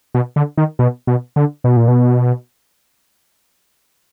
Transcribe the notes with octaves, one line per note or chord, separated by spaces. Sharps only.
B2
D3
D#3
B2
B2
D3
B2
A#2
B2